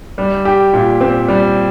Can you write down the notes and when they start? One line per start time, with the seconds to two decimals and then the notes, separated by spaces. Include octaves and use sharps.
0.18 G3
0.45 G4
0.73 A#2
1.01 C4
1.29 G3